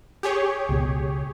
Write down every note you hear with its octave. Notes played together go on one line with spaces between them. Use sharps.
G4 G#4 C#5
C#2 B2